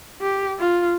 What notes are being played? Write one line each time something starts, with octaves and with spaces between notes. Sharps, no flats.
G4
F4